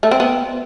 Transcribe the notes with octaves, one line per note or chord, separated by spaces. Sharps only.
A3
C4
B3